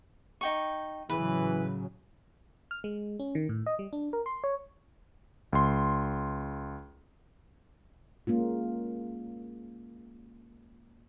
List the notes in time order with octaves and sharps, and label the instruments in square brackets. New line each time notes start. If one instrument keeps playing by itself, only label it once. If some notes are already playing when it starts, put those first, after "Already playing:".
[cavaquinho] D#4 G5 C#6
[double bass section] A2 C#3 F#3 [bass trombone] E3 [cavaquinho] B4
[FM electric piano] F6
G#3
C#4
D#3
A2
D#5
G3
D4
A#4
C6
C#5
[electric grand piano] C#2 C6
[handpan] G#3 A#3 C#4 F4